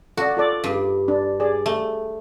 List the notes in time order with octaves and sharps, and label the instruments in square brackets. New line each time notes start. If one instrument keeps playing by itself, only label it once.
[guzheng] F#4 [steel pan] A4 D5
[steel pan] F4 A4 D5
[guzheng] G2
[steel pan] D4
G#4 D5
[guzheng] A3